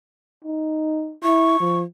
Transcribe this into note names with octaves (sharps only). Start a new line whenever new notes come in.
D#4
E4 C#6
F3